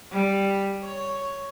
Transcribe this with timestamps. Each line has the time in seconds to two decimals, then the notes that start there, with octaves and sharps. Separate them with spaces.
0.11 G3
0.84 C#5